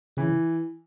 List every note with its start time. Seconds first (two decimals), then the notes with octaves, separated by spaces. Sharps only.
0.17 C#3 E3